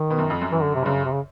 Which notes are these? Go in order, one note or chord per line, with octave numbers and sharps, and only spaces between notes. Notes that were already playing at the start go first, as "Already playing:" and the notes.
Already playing: D#3
B2
F#2
F2
F#2
F#2 E3
D3
C3
G2
F#2 C#3
C3
C#3